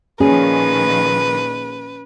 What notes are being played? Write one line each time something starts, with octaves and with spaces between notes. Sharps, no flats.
A#2 D#3 F3 C#4 G#4 B4